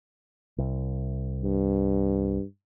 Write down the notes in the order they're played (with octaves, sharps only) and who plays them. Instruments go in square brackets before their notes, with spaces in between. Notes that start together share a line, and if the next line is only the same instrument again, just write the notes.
[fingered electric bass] C2
[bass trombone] G2